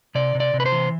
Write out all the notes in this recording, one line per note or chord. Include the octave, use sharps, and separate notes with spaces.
C3 D5
C3
D5
C3
B4
C5
E3